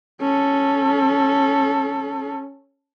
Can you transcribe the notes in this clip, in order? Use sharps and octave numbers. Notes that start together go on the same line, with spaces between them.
C#4 A4